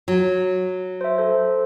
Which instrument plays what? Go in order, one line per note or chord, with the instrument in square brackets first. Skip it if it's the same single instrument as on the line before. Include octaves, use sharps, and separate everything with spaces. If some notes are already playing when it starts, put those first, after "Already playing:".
[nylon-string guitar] F#3
[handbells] C5 E5
A4 C5